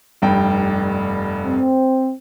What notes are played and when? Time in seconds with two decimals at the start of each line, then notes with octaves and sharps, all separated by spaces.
0.22 F1 G2 G5
1.44 C4